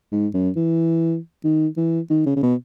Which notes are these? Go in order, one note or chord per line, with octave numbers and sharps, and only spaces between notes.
G#2
F#2
E3
D#3
E3
D#3
C#3
C#3
B2